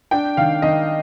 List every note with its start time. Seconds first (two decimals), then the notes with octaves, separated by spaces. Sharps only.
0.11 D4 G5
0.37 D#3 F5
0.62 D#3 D#5